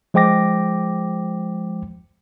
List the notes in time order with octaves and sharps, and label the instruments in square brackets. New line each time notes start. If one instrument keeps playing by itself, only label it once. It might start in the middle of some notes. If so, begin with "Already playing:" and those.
[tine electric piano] F3 G#3 C5 G5 D6 A#6